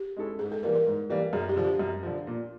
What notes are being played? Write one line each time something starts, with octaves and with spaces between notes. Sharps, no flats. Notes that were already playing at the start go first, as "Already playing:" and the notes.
Already playing: G4
G#3 C#4 E4 A4
G#2 G#4
A4
E3 G3 A#3 A#4
A#4
G#2
E3 G3 A#3
F#2 G#4
G4
D3 F3
G4
F#2
D3 F3
A#2